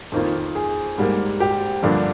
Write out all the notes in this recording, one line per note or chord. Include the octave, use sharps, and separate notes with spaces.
F2 D#3 A#3 F4
G#4
G#2 G3 A#3
G4
G2 D3 F3 A#3 D4